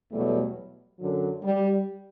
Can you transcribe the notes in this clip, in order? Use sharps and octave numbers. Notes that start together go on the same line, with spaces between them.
E2 B2 F#3 G3 A3
F#2 D3 F#3
G3